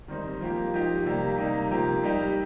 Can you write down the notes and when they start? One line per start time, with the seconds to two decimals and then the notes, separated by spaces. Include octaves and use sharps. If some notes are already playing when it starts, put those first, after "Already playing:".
0.08 D#3 G3 C4 D#4
0.41 F3 A#3 G4
0.74 F3 D#4 G4
1.05 C3 G3 A#3 G4
1.38 C3 G3 A#3 D#4
1.70 C3 F3 A#3 G4
2.04 G3 D#4 G4